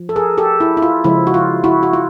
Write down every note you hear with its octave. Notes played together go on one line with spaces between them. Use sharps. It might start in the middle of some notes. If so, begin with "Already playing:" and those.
Already playing: F3
A4
G#4 A#4
G4 A4
E4
E4
F4
C#3 F3 G#3 E4
F#4
F4
E4 F#4
F#4
F4